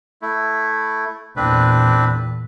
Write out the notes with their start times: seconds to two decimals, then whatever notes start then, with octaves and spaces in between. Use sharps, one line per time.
0.22 A3 E4
1.37 E2 A#2 C4 D4 B4